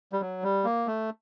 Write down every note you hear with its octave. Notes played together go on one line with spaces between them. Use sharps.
G3
F#3
G3
A#3
A3